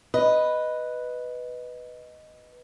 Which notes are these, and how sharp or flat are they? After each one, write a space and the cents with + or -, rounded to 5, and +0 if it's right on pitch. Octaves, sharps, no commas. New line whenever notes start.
B4 +0 D#5 +0